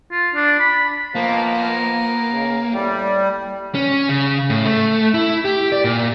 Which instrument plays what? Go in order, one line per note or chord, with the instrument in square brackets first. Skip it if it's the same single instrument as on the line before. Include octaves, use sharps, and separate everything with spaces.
[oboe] F4
D4
B5
[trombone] F3 [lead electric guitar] A#3 [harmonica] B3 A#4
[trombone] C#3
[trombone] A2 [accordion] G3
[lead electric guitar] C#4
C#3
A2
A3
E4
G4
D5
A#2